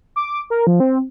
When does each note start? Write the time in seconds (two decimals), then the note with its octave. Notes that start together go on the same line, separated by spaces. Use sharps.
0.16 D6
0.50 A#4
0.67 F3
0.80 C4